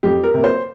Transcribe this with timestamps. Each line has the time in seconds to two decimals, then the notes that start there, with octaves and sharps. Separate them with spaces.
0.03 F2 G4
0.23 A#4
0.34 C3 A#3
0.44 C5